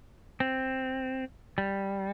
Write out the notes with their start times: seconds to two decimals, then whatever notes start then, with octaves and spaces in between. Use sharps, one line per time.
0.40 C4
1.58 G3